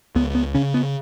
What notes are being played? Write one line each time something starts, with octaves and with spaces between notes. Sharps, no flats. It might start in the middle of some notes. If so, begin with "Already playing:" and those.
C#2 B3
B3
C#3 C#4
B3